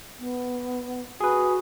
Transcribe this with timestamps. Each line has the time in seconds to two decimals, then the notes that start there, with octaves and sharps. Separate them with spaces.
0.18 B3
1.20 F#4 G#4 B4